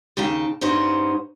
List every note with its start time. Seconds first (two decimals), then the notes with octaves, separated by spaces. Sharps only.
0.17 D#2 C#3 D#4 G5 A5
0.61 G2 C#4 D#4 F#4 C5